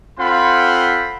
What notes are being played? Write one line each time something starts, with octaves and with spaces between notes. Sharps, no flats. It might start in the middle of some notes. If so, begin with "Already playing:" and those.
C4 F4 A4 C5 F#5 B5